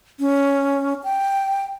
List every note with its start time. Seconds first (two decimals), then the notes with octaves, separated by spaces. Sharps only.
0.20 C#4
1.04 G5